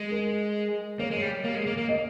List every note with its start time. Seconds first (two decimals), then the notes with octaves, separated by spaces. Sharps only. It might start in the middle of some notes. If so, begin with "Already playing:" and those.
Already playing: G#3
0.11 A#4
0.99 A#3 C#5
1.11 G#3
1.22 G3
1.44 A#3
1.55 G#3
1.67 A#3
1.77 A#3
1.89 D#5